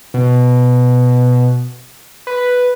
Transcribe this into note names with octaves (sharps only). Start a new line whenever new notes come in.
B2
B4